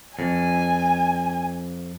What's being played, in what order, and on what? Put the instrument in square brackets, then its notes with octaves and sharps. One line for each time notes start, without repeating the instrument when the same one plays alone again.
[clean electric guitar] F2 [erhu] G#5